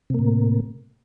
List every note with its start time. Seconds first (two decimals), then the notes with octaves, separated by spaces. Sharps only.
0.10 C3
0.14 A#3
0.19 A2